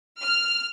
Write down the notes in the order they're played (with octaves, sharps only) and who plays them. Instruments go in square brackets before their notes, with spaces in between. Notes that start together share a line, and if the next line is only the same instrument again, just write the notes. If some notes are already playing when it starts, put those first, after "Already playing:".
[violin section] F6